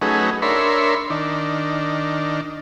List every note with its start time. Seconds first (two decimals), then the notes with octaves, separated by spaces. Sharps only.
0.01 F#3 A3 C#4 D#4 G#4 B4
0.42 D4 A#4 C#5 E5 B5 C6
1.10 D#3 D4